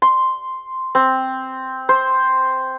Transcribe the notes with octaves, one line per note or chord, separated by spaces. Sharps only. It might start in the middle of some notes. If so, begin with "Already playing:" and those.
C6
C4
C5